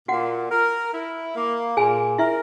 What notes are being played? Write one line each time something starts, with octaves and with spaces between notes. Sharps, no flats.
A#2 F#4 F#5
A#4
E4
A#3
A#2 G#4 G#5
E4 A#4 E5